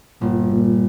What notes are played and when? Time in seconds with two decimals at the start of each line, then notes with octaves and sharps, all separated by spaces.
0.21 G1 A#2
0.52 A#2